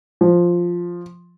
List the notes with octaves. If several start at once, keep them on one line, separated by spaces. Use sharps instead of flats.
F3